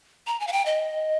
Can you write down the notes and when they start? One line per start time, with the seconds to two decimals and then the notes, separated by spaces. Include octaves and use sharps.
0.27 A#5
0.40 G#5
0.47 F5
0.52 G5
0.66 D#5